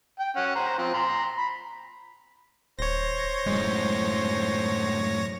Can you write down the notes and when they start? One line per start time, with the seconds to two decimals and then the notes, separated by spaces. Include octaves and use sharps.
0.20 G5
0.36 C#4 F#5
0.56 C5 A#5
0.78 F3 C4
0.94 A#5 C6
1.38 B5
2.79 D#1 C5 C#5 A#6
3.46 F#2 A2 G#3